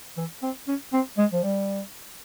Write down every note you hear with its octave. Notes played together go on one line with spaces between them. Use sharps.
E3
C4
C#4
C4
G#3
F3
G3